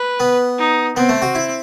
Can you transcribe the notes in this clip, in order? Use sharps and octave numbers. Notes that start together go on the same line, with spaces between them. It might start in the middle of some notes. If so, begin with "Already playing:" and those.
Already playing: B4
B3
D#4
B3 C4
A3
F#4
E4